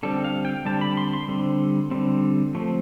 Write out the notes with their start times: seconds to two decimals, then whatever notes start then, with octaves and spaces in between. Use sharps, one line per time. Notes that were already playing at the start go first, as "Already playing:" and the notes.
0.03 D3 G3 C4 A4
0.24 F5
0.45 G5
0.65 D3 G3 C4 A5
0.81 B5
0.97 C6
1.13 C6
1.28 D3 G3 C4
1.91 D3 G3 C4
2.55 F3 A3 C4